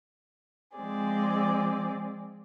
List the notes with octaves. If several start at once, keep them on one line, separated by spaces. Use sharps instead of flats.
F3 G#3 C4 G#4 D5